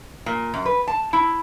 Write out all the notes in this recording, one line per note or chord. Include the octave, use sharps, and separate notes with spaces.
A#2
F#2
B4
A5
E4